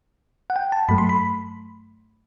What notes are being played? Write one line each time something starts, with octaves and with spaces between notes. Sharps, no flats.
F#5
G5
A5
G2 F#3 A3 B5
C6
B5